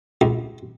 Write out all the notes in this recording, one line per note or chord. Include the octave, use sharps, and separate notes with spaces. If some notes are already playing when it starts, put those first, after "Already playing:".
C#2